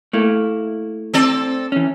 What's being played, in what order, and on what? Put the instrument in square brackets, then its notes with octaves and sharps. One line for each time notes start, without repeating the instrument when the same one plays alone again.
[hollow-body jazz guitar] A3 A#3 E4
[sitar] C4 A4 D5
[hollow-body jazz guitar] E3 C#4